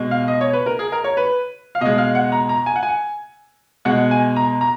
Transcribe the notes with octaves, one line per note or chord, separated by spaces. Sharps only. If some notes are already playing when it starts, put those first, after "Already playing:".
Already playing: B2 G#3
F5
D#5
C#5
B4
A#4
G#4
A#4
C#5
B4
F5
B2 G#3 D#5
F5
F#5
A#5
A#5
G#5
F#5
G#5
B2 G#3 F#5
G#5
A#5
A#5